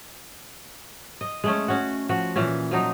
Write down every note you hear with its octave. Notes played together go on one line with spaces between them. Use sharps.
D#5
G#3 A3 C#4
C#4 F#4
F3 F#4
A#2 E3 C#4
F3 F#3 D#4